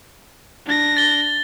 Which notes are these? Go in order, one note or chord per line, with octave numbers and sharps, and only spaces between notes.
D4 A#6
A6 G7